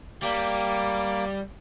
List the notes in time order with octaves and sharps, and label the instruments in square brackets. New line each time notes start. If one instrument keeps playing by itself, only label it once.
[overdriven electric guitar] G3 [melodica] A#3 D6